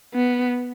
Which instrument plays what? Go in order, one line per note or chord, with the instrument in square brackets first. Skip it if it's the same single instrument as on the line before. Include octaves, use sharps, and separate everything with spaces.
[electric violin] B3